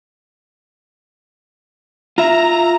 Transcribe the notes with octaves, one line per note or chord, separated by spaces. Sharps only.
F4 E5 A#5